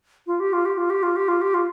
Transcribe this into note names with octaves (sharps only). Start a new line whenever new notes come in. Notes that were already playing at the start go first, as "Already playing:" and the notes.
F4
G4
F4
G4
F4
G4
F4
G4
F4
G4
F4